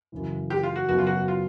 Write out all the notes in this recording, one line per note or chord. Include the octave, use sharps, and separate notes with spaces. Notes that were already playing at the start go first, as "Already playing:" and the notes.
F#2 C#3 E3
G4
F4
F#4
F#2 C#3 F#3 B3 F#4
F4
F#4
F4